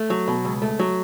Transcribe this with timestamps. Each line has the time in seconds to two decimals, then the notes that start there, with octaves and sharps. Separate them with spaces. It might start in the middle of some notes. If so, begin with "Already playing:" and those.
Already playing: A3
0.10 F#3
0.28 B2
0.45 C#2
0.62 A3
0.79 F#3